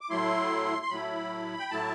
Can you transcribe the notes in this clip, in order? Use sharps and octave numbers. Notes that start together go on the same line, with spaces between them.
D6
A2 F#3 A3 E4 C6
C6
A2 F#3 A3 E4 B5
G5
A2 F#3 A3 E4 A5